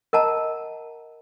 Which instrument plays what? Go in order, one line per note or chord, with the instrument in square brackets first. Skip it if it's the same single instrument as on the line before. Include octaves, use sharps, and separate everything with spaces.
[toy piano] A#4 D#5 F#5 A5 A#5